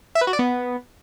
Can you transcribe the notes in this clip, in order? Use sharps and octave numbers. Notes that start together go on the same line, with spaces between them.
E5
B4
F#4
D5
B3